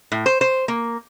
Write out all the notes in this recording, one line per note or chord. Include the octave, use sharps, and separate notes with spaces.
A2
C5
C5
A#3